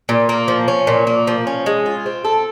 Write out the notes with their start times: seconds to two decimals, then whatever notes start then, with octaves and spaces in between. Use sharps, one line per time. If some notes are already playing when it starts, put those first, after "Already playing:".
0.09 A#2
0.29 A#3
0.48 F3
0.68 C#4
0.87 A#2
1.07 A#3
1.27 F3
1.47 C#4
1.66 G#3
1.86 F4
2.06 C4
2.25 A4